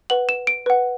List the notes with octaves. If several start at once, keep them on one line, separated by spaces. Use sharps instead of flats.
B4 F#5 F#7
E7
D7
B4 F#5